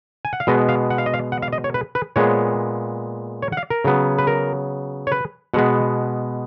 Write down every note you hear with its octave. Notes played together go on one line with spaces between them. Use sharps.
G#5
F#5
F5
B2 G#3 B3 D#5
F5
F#5
F5
D#5
F5
F#5
F5
D#5
C#5
B4
B4
A#2 G#3 B3 C#5
C#5
F#5
F5
A#4
C#3 F#3 B3
B4
A#4
C#5
B4
B2 G#3 B3 F#5